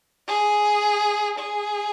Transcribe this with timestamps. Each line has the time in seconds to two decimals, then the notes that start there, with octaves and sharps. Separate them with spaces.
0.28 G#4
1.39 G#4